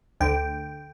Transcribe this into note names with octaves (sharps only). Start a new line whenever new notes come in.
D2 D3 G5